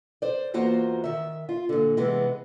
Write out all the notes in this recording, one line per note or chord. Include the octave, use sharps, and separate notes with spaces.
C5 D5
E2 A#3 F4 F#4 C5 A#5
D#3 E5
F4
A#2 D3
C3 E3 G#3 B3